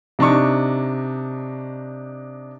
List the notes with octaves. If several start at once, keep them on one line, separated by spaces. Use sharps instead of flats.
C3 D4 D#4 C#6